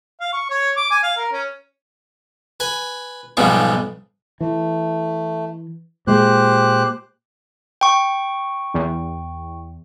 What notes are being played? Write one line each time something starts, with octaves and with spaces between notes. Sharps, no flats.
F5
C#6
C#5
D6
G#5
F5
A#4
C#4
B4 G#5
B1 G#2 C#3 F3 G3 B3
E3 A3
A#2 G#3 G4 C5 F#6
G5 C#6
E2